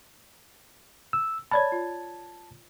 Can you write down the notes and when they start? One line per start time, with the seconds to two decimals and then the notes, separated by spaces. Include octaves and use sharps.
1.13 E6
1.51 C#5 D5 A5 B5 G#6
1.72 F4